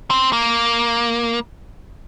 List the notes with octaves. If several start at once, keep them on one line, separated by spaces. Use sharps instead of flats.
C4
A#3